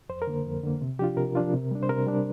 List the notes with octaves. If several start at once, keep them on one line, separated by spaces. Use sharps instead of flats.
F2 C5
A#4
D3 A#3
F2
D3 A#3
C3
F3 D4 F4 G4
C3 A#4
F3 D4 F4
C3
G3 D4
C5
C3 A#4
G3 D4